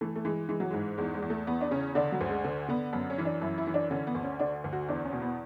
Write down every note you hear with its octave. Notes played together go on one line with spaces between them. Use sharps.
E3 A3
A3
E3 G#3
E3 G#3
F#3
G#2 G#3
E2 G#3
G#3
E2
A3
E2 B3
D4
C#3 C#4
D3 D4
F#3
D2
G#3
D3
D3 B3
F#2 B3
C#4
E3
D4
F#2 E4
E4
E3
D4
D3 C#4
B3
D2
C#4
D3 D4
D2
F#4
E2 D4
C#4
B2
B3